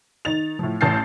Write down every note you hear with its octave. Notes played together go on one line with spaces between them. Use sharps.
D#3 D#4 A6 F7
A2 F3
A1 A2 A5 G6 A6 C7